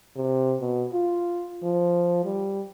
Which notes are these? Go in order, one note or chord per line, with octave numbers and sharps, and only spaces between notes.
C3
B2
F4
F3
G3